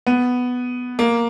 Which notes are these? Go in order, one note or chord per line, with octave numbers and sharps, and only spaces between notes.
B3
A#3